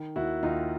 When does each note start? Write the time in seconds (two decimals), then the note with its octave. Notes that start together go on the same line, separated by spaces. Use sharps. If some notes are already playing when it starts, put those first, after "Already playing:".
Already playing: D#3
0.16 D#2 E4 F#4
0.43 D#2 D#4 F4